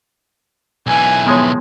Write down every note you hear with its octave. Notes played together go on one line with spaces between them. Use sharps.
B1 E3 G#5
D#3 F3 G#3 B3 C#5